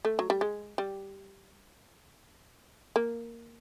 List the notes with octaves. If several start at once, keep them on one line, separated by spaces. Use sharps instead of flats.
A3
F#3
G3
G#3
G3
A#3